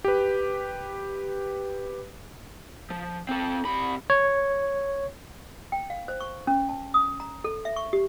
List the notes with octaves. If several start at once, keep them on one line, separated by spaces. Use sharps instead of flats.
G4 B4
F3
C4 A4
C3 B5
C#5
G5
F5
C5
C#6
C#4
A5
D#6
A#5
A4
E5
C#6
G4